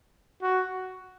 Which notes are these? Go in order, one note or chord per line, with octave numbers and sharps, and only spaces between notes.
F#4